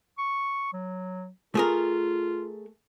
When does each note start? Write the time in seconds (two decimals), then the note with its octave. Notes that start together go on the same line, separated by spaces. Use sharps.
0.18 C#6
0.73 F#3
1.55 A3 F4 G#4 A#4